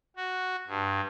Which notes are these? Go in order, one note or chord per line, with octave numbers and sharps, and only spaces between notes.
F#4
G2